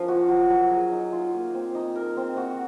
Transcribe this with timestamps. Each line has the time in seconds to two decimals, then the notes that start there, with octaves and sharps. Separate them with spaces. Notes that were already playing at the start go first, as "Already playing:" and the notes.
Already playing: F3 C#4 A#4
0.08 F#4
0.28 F#3
0.50 F#3
0.71 G#4
0.92 D#4
1.12 F4
1.34 A#3
1.54 C4
1.75 D#4
1.95 A#4
2.17 C4
2.37 F#4